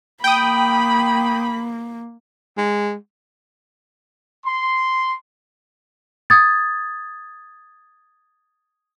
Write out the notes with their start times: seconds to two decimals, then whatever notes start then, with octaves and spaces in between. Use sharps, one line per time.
0.24 A#3 G5 B5 D#6
2.57 G#3
4.46 C6
6.30 D#6 G#6 A6